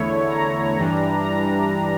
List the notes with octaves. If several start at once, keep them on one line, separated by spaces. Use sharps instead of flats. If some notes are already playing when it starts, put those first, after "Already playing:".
Already playing: E2 D3 A3 E4 C#5
A#5
G2 E3 G3 D4
A#5